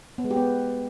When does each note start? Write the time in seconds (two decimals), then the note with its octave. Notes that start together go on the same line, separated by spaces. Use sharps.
0.18 B3
0.24 G#3
0.30 G4
0.37 B3